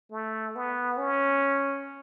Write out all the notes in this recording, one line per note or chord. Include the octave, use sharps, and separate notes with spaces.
A3
B3
C#4